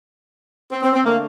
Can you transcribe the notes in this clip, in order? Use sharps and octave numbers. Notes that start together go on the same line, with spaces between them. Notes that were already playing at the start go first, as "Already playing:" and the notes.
C4
C4
C4
D3 A3 A#3